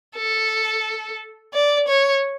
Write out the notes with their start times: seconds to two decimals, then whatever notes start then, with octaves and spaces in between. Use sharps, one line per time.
0.17 A4
1.54 D5
1.88 C#5